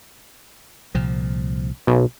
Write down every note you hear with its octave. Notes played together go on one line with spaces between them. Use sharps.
C2 A#2 F3
B1